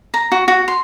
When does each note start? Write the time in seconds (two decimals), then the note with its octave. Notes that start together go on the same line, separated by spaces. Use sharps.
0.14 A#5
0.32 F#4
0.48 F#4
0.68 C6